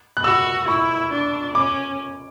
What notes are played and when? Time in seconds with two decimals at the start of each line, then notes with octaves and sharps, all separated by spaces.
0.17 F#6
0.24 F#4 E6
0.68 E4 C#6
1.11 D4
1.55 C#4 D6